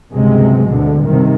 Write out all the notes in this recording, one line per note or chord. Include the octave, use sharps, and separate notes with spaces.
G1 C#2 C3 F#3 G#3
D2 B2 D3
G2 C3 D#3